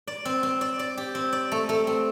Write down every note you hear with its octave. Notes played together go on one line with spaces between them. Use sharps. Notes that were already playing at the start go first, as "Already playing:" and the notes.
D5
C4
C4
D5
D5
G4
C4
D5
A3
A3
C4